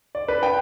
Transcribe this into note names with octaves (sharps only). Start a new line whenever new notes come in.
D5
B4
G5